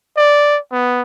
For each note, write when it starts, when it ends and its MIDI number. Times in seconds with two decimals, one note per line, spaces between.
0.17 0.58 74
0.72 1.02 59